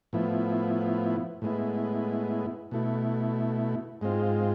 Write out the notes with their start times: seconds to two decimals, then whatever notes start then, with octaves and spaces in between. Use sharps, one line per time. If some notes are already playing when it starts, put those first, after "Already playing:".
0.13 A2 F3 B3 E4
1.42 A2 G#3 B3 E4
2.71 B2 A3 E4
4.01 G#2 G#3 C4 F4